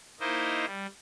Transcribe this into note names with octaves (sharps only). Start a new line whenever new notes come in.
A#3 D#4 E4 C5 D#5
G3